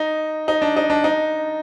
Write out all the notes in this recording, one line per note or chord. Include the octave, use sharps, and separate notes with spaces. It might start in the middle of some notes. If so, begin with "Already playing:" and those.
Already playing: D#4
D#4
D4
D#4
D4
D#4